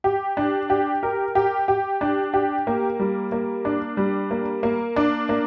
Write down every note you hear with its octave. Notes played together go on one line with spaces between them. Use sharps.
G4
D4
G4
A#4
G4
G4
D4
G4
A#3
G3
A#3
D4
G3
A#3
A#3
D4
A#3